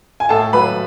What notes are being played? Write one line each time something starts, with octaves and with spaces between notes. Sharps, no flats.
G#5
A2 A4 A5
F#3 B4 B5